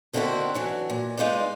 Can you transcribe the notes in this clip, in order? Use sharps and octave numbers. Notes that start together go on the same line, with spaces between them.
D#2 D3 D#3 C4 E4 F#4
E3 F#3 D4
A#2
G#3 D#4 F4 B4 D5